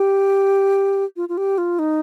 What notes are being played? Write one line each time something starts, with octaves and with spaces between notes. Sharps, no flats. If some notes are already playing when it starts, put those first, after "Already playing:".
Already playing: G4
F4
F4
G4
F4
D#4